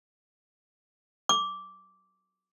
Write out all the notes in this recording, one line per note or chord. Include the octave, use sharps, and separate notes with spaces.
D6